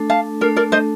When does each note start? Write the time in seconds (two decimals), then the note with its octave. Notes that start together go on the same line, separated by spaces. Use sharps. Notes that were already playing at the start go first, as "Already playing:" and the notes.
Already playing: A3 D4 A4
0.10 F5 A5
0.41 A3 D4 A4 A#4
0.56 A#4 D5
0.72 C5 D#5